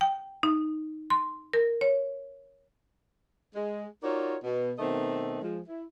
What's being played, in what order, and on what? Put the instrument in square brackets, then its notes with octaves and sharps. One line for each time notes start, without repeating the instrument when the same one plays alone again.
[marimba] G5
D#4
C6
A#4
C#5
[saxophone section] G#3
D#4 F4 F#4 A#4 C#5 D5
B2
B2 D#3 A3 B3 C4 D#5
F3 G#3
E4